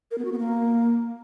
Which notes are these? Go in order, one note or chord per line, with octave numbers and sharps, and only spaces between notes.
A#4
B3
F#4
B3
A#3